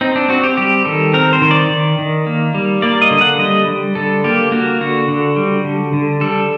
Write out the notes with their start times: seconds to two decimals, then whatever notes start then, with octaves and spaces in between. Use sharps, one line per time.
0.01 C4 D#4
0.16 D4
0.29 C4 F#4
0.44 G4
0.57 G3 G4
0.85 D#3 A4
1.14 C4 A#4
1.33 C5
1.42 D#3
1.51 D5
1.70 D#3
1.99 D#3
2.26 A#3
2.54 G3
2.82 A#3 D5
3.02 D#5
3.11 D3
3.21 F#5
3.39 G3 D#5
3.68 G3
3.95 D3 A4
4.24 A#3 G4
4.52 A#3 F#4
4.81 D3 F#4
5.08 D3
5.36 G3
5.64 D3
5.93 D3
6.21 G3 A4